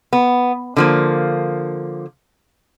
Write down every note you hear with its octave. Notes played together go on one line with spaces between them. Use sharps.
B3
D3 F3 A#3